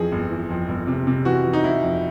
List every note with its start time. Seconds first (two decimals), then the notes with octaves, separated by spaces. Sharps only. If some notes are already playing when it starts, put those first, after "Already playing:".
Already playing: F2 E3 G#4
0.12 G1
0.30 E3
0.50 F2
0.68 G1
0.87 C3
1.07 C3
1.25 E3 F#4
1.44 E3
1.53 D#4
1.64 E3 E4
1.82 F2